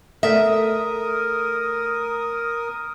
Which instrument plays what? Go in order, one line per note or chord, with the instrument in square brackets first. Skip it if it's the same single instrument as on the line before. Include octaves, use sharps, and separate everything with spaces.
[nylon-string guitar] A3 [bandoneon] A#4 [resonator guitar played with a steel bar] E5 [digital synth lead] D#6